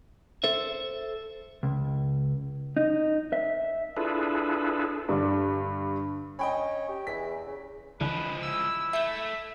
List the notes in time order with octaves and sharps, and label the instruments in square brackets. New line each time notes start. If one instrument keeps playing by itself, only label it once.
[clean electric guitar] A4 C5 E5
C#2
D#4
E5
[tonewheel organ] D4 E4 F4 G#4 A4 B4
[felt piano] G2 D3
[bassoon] C#4 [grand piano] D#5 G5 B5
[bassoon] G4
[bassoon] E2 [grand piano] B6
[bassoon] C#3
[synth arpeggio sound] C#2 D3 E3 [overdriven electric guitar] F3 G#3 [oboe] B4
[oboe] E4 [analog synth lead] E6
[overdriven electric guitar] A3 [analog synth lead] E5 [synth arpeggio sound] G6 C7